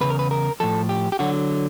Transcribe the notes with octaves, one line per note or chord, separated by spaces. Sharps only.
E2 C#3 B4
A#4
B4
A#4
A2 F3 A4
G4
G4
D3 F#3 F#4